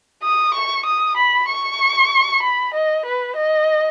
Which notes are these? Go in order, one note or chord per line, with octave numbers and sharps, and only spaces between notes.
D#6
C#6
D#6
B5
C#6
B5
D#5
B4
D#5